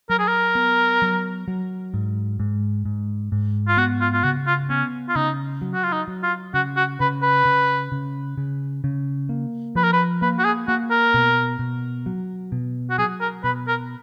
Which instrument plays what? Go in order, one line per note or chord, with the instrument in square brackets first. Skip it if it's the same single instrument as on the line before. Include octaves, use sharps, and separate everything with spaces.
[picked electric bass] F#3 [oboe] A#4
[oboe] G#4
A#4
[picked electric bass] B3
F#3
F#3
G#2
G#2
G#2
G#2
[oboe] F4
[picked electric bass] B3 [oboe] F#4
[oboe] F4
F4
[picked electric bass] C#3 [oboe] F#4
[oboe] F4
[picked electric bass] B3 [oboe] C#4
[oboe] F4
[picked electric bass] C#3 [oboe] D#4
[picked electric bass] F#3
[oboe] F#4
F4
D#4
[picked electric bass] F#3
[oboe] F4
[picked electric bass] C#3 [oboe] F#4
[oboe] F#4
[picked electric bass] C#3 [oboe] B4
[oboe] B4
[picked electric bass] C#3
C#3
C#3
C#3
A#3
[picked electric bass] F3 [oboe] B4
[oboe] A#4
B4
[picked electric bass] A#3 [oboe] B4
[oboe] F#4
G#4
[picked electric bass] A#3 [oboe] F#4
[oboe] A#4
[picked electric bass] B2
B2
F#3
B2
[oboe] F#4
[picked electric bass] F#3 [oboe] G#4
[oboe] A#4
[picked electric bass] B2 [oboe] B4
[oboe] A#4